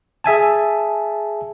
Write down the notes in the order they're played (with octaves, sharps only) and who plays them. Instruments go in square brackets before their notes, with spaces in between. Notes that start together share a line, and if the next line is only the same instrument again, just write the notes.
[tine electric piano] G#4 E5 G#5 A5